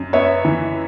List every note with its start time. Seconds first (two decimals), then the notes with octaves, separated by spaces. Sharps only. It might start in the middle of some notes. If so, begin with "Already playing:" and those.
Already playing: F#2
0.13 B3 C#5 E5
0.45 E3